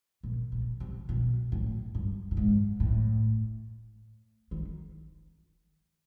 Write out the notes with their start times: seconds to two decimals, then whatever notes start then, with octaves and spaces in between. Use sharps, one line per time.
0.23 A#2
0.52 A#2
0.80 C3
1.09 B2
1.52 A2
1.95 G2
2.31 A2
2.37 G#2
2.80 A2
4.51 D#3